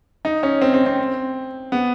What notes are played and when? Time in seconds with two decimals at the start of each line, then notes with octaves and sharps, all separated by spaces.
0.25 D#4
0.43 C#4
0.61 C4
0.74 C4
0.86 C4
1.72 B3